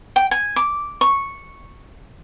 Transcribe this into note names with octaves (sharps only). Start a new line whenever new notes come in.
G5
G#5
D6
C#6